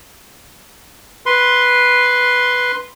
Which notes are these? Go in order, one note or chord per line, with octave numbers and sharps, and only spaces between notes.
B4 C6